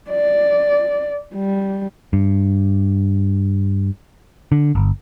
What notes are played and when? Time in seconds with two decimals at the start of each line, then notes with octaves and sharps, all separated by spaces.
0.10 D5
1.34 G3
2.13 G2
4.52 D3
4.75 G1